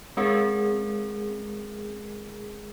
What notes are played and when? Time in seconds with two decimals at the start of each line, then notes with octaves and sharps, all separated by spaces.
0.17 G#3 C4 C#4 G#4 A#4